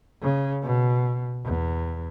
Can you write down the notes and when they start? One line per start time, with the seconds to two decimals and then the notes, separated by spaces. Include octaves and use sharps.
0.22 C#3
0.63 B2
1.45 E2